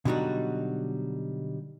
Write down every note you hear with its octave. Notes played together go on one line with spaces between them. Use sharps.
B2 D3 F#3 G3 D#4 F#4